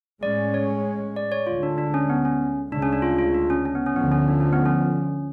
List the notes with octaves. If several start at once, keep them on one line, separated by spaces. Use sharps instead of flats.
A2 G#3 C#4 D5
C#5
D5
C#5
D2 D3 G#3 F4
D4
D4
C#4
B3
C#4
D2 C#3 G#3 D4
C#4
D4
F4
F4
D4
C#4
C#4
B3
C#4
D2 D3 F3 B3
C#4
D4
C#4
B3
C#4